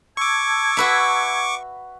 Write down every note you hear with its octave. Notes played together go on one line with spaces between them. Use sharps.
A5 C#6 D6 E6 G#6
F#4 B4 E5